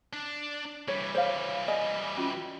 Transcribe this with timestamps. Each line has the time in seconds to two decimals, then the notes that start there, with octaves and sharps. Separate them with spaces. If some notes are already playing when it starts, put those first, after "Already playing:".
0.13 D4
0.88 E3 G3 C#5
1.15 C5 C#5 F5
1.68 D5 D#5 G#5
2.18 C#4 F4 F#4